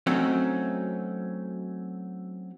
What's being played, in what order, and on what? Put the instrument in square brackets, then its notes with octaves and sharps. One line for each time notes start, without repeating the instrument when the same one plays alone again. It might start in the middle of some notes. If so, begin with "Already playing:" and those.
[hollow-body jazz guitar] F#3 A3 C4 C#4 D#4